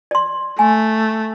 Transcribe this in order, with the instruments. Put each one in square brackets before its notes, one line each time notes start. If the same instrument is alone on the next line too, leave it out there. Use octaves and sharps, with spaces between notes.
[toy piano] D5 C6
[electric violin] A3 [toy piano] G#5